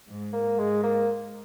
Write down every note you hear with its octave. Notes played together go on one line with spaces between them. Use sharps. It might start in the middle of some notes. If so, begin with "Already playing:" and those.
G#2
A#3
G#2 G#3
A#3